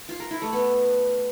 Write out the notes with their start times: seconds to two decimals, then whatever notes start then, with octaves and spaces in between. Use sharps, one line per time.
0.09 F4
0.20 A#4
0.31 E4
0.42 A3
0.53 B3